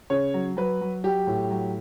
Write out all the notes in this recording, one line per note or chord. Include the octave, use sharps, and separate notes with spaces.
C#3 C#5
F#3
F#3 B4
F#3
F#3 G4
A2
F#3